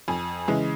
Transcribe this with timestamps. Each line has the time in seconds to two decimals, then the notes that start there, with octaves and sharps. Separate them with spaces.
0.08 F2 G#5
0.48 C#3 E3 G#3